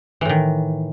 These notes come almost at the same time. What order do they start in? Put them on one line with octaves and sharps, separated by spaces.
E3 A2 D#3